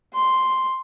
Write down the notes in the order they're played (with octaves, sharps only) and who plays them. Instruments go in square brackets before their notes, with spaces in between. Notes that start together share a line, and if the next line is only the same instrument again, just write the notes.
[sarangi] C6